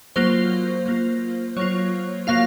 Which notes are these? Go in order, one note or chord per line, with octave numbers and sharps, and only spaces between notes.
F#3 A#3 F4 C5
F#3 A#3 F4
F#3 A#3 F4 C#5
F#3 A#3 F4 F5